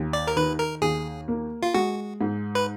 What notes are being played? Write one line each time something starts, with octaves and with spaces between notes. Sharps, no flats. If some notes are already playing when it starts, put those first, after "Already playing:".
Already playing: D#2
D5
A#4
D#3 B4
A#4
D#2 G#4
A#3
F4
G#3 F#4
G#2
B4